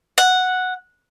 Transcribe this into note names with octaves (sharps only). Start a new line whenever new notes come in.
F#5